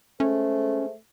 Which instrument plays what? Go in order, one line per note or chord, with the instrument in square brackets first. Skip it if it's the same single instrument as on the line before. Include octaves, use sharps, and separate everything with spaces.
[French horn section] G#3 G#4 C5 [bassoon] A3 [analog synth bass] C#4